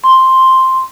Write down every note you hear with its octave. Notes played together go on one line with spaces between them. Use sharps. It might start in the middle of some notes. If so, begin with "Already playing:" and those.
C6